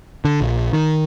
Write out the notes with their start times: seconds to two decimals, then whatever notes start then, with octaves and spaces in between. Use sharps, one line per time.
0.25 D3
0.41 A#1
0.73 D#3